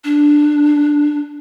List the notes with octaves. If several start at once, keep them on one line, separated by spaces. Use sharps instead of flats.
D4